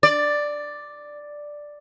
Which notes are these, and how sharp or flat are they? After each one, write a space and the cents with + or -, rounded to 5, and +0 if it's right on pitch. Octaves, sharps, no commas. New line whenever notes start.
D5 +5